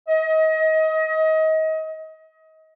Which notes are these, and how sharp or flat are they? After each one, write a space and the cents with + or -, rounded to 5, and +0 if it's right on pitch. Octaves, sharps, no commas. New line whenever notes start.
D#5 +30